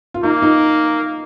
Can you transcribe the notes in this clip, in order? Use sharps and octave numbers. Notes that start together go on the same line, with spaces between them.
F4
A#3 D#4
D#4